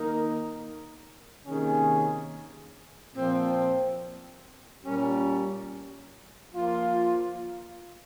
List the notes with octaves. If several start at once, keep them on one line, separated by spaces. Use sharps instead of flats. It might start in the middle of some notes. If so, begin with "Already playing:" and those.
Already playing: D#3 A#3 D#4 A#4
C3 D#3 A#3 C#4 G#4
A#2 F3 C4
A#2 G3 C#4 G4 A#4
F3 A#3 F4